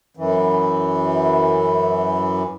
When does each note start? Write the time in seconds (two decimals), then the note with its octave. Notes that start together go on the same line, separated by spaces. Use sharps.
0.17 F#2 E3